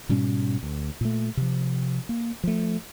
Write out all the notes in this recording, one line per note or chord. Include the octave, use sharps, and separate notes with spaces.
G#2 B2 G3 C#4
D2
A#2 A3
C3 F3
A#3
F3 A3